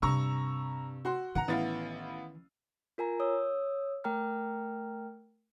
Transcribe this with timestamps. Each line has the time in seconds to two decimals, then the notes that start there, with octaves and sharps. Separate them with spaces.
0.02 G2 C3 A#5 C#6 E6
1.05 F#4 F#5 C6
1.35 D#3 E3 F#5 A#5
1.48 A1 B3 E4 F5 A6
2.98 F4 A#4 G#5 A#5
3.20 C#5 D#6 E6
4.04 A3 A#4 G5 A#5 F6